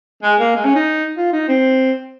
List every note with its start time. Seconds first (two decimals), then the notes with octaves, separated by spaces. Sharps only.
0.23 G#3
0.40 A#3
0.55 G#3
0.65 C#4
0.75 D#4
1.17 F4
1.33 D#4
1.48 C4